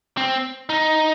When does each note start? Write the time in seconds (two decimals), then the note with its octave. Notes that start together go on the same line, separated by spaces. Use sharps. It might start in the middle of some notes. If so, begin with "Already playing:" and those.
0.17 C4
0.69 D#4